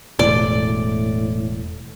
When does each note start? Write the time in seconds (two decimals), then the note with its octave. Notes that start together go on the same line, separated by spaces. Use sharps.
0.19 E1 A2 D5